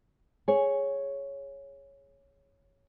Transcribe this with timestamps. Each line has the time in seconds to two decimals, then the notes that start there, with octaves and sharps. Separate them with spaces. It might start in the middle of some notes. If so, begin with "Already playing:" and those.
0.48 G#4 C#5